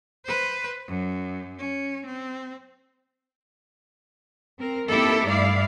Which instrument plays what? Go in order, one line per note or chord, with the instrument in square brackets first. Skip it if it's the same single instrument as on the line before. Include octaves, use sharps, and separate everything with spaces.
[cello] B4 C5
F#2
C#4
C4
[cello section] C4 A#4
A#3 C4 D#4 E4 G4 A4
G2 A3 E4 D5 F5